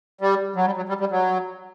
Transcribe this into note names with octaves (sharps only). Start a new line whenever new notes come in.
G3
F#3
G3
F#3
G3
G3
F#3